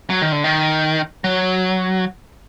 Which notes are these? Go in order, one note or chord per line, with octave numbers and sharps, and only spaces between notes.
F#3
D#3
D3
D#3
F#3